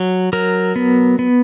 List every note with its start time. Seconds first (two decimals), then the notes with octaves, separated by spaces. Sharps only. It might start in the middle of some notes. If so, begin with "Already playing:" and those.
Already playing: F#3
0.33 F#3 A#4
0.76 B3
1.19 B3